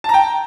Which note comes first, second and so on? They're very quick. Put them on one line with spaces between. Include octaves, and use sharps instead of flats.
A5 A#5 G5